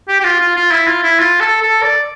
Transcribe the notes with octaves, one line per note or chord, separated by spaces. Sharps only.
G4
G4
F4
F4
F4
E4
F4
E4
F4
A4
A4
D5